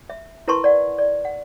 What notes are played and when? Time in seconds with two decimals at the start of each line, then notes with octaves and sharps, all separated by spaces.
0.10 E5
0.48 E4 A#4 B4 A5 C6 C#6
0.64 D5 F#5
0.98 D5
1.25 F#5